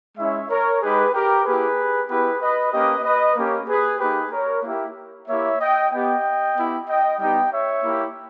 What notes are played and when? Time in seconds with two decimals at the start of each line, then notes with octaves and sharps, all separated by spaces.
0.17 G#3 C#4 E4 C#5 E5
0.49 A#4 C#5
0.81 G#3 D#4 G4 G#4 B4
1.12 G4 A#4
1.45 A#3 E4 G4 G#4 B4
2.08 B3 E4 G4 G#4 B4
2.40 B4 D#5
2.72 A#3 C#4 G4 B4 D#5
3.04 B4 D#5
3.36 A#3 C#4 G4
3.67 G#4 B4
3.99 A#3 D#4 G4 G#4 B4
4.31 A#4 C#5
4.63 A#3 E4 G4
5.27 A#3 E4 G4 C#5 E5
5.59 D#5 G5
5.91 B3 G4 D#5 G5
6.55 B3 E4 G4
6.87 D#5 G5
7.18 G3 B3 D#4 G4 D#5 G5
7.50 C#5 E5
7.82 A#3 E4 G4